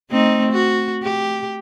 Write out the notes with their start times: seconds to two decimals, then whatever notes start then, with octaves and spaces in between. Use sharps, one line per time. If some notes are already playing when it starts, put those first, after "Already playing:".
0.10 A3 C4 D#4
0.52 F#4
1.03 G4